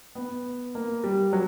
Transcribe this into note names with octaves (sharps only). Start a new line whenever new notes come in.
B3
A#3
G3
F#3